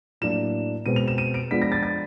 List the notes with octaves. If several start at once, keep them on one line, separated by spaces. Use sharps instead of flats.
A2 F#3 A#3 D4 E7
B2 G#3 C4 D#7
F7
E7
D#7
D7
F3 G#3 B3 D4 B6
A#6
A6
A6